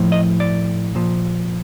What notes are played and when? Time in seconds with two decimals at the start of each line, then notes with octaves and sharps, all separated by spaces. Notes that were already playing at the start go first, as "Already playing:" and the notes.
Already playing: A2 F3
0.12 D#5
0.40 D5
0.95 A#2 F3